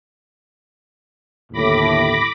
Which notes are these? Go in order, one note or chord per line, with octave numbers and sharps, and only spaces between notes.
G1 D#2 A2 B5 D6 A#6